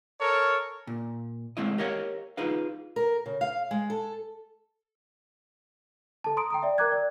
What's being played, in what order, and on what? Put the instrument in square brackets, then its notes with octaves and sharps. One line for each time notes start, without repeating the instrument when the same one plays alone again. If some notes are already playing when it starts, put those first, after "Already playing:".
[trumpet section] A4 A#4 C#5
[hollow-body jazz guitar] A#2
G#3 A3 C4 E4 D#5
G4 A#4 C#5 D#5 F5
D#4 F4 G#4 B4 F5
[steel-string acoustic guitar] A#4
C#3
F5
G#3
A4
[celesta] A4 A5
A#5 C6 D#6 D7
G5 A#5 D#6
D5 E5
A#4 G5 A#5 D6 F#6 G#6
D5